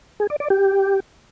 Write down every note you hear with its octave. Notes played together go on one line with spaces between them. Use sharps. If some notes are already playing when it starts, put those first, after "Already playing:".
G#4
D5
D5
G4